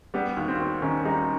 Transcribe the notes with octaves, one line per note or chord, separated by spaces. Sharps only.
G3 B3
D#2
C4
D#2
D#3 C#4
G3 D#4